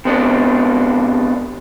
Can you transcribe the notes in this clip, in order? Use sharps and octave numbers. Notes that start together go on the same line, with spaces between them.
C3 B3 D4